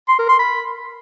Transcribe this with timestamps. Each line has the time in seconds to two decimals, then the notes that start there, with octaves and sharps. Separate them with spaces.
0.09 C6
0.19 A#4
0.29 C6
0.39 B5